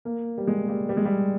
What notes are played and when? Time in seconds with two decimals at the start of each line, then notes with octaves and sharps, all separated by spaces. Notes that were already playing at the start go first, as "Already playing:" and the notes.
0.05 A#3
0.38 G3
0.47 G#3
0.68 G3
0.89 G3
0.97 G#3
1.05 G3